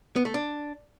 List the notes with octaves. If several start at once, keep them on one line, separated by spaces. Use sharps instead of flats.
B3
A3
D4